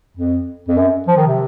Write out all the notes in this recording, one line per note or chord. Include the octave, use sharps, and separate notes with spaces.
F2
F2
F#2
F3
D#3
C3